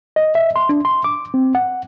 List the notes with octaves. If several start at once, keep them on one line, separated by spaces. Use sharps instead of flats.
D#5
E5
C6
D4
C6
D6
C4
F#5